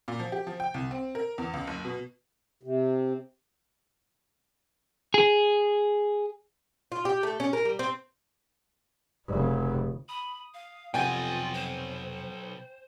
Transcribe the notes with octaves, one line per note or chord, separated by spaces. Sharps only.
A#2
F3
G4
F3
G5
C2
C4
A#4
E2
C#2
F#1
B2
C3
G#4
F4
G4
A3
C#4
A#4
G3
C4
F1 C#3
B5 D#6
F5
B1 F2 C3 B3 F4 D#5 G5 G#5
C5